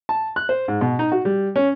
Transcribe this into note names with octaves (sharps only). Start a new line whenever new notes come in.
A5
F#6
C5
G#2
B2
D#4
F#4
G3
C#4